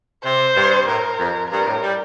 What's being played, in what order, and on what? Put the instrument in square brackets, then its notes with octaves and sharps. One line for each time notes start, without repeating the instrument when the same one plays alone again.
[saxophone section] C3 [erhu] C5
[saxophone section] G2
[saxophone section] A2 [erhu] A#4
[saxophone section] F2
[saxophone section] G2 [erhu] A#4
[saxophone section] A2
G3